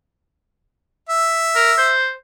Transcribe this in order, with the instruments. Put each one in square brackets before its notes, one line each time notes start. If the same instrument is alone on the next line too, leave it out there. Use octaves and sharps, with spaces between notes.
[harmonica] E5
[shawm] A#4
C5